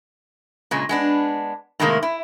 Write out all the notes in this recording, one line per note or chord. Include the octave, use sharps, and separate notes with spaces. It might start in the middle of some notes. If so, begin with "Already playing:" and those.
A#2 C#3 G#3
G#3 B3 D4
A2 C3 D#3 G#3 A#3 A#4
E4